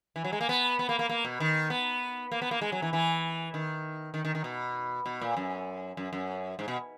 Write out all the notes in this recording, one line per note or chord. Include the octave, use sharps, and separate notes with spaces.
E3
F#3
G#3
A#3
B3
B3
A#3
A#3
A#3
B2
D#3
B3
A#3
B3
A#3
G#3
F#3
E3
E3
D#3
D#3
D#3
D#3
B2
B2
A#2
F#2
F#2
F#2
G#2
B2